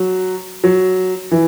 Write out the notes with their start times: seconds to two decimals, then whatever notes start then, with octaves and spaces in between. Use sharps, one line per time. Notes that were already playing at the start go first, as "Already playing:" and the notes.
Already playing: F#3
0.64 F#3
1.31 E3